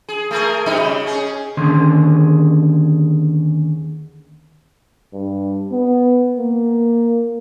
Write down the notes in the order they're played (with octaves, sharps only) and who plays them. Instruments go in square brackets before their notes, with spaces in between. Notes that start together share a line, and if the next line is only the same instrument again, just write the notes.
[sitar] G#4
A3 G#4 A#4
B2 G3 D#4
C#3
C#4 G#4
[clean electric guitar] D#2 D3 D#3 C#4 G#4 C6
[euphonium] G2
B3
A#3